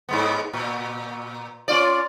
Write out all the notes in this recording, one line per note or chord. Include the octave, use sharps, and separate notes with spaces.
G#2 G#3 B3
A#2
C#4 F4 D5